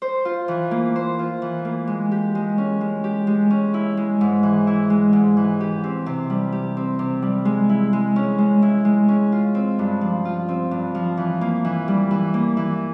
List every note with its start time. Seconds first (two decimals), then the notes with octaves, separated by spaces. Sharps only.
0.02 C5
0.25 F4
0.48 E3
0.71 A#3
0.96 C5
1.19 F4
1.42 E3
1.65 A#3
1.87 G#3
2.11 G4
2.35 G#3
2.58 C#4
2.81 G#3
3.04 G4
3.27 G#3
3.50 C#4
3.74 E4
3.97 G#3
4.21 G#2
4.43 E3
4.67 E4
4.90 G#3
5.13 G#2
5.37 E3
5.60 G4
5.84 C4
6.06 C3
6.30 G3
6.52 G4
6.77 C4
6.99 C3
7.22 G3
7.45 G#3
7.69 E4
7.93 G#3
8.16 C#4
8.38 G#3
8.62 E4
8.85 G#3
9.08 C#4
9.32 F4
9.55 C4
9.79 G2
10.01 F3
10.25 F4
10.49 C4
10.71 G2
10.95 F3
11.17 E3
11.41 A#3
11.65 E3
11.88 G3
12.11 E3
12.34 A#3
12.57 E3